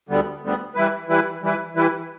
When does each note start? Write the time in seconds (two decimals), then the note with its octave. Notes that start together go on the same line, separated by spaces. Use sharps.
0.09 D2 D3 G3 B3
0.42 D2 D3 G3 B3
0.75 E3 G3 E4 B4
1.08 E3 G3 E4 B4
1.42 E3 G3 E4 B4
1.75 E3 G3 E4 B4